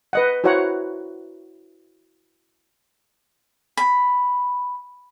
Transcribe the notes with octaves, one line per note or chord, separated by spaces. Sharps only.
B4 D#5 F#5
E4 F#4 C5 C#5 F#5 A#5
B5